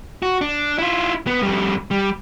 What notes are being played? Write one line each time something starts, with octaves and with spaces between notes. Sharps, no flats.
F#4
D4
E4 F4
B3
F2 G3
G3